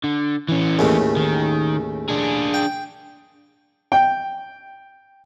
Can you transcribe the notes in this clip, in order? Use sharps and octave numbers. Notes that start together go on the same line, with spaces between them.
D3
E3 C#4
D#2 A2 C#3
D#3
D4 G#4
G5
G5